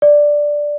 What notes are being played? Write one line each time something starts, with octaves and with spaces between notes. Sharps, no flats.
D5